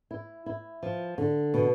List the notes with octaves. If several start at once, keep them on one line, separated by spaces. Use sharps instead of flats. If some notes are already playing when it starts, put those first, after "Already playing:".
E4
E4
F3
D3
B2